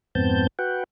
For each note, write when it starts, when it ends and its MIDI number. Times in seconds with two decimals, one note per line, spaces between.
0.15 0.47 41
0.15 0.47 44
0.15 0.47 59
0.15 0.47 60
0.15 0.47 81
0.15 0.47 91
0.59 0.84 66
0.59 0.84 71
0.59 0.84 78
0.59 0.84 79